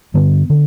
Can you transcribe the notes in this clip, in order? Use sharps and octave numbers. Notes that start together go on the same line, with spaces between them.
G2 D3 B3
D3